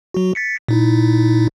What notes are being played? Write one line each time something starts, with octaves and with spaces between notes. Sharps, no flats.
F#3 F#4
A6 B6 C#7
A#2 D#4 E4